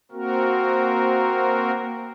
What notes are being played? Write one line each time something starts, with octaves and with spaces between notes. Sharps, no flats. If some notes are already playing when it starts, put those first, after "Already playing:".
A#3 C4 F#4 A#4